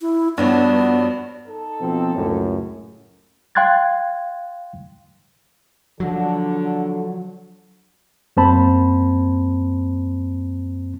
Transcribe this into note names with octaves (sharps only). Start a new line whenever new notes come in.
E4
G2 F3 F#3 B3 D4
D#4 A4
B2 F3 C4
C#2 F#2 A2
F5 G5 C6 F#6 G#6 A6
D3 F3 F#3
F#2 A#3 C4 C5 A5 B5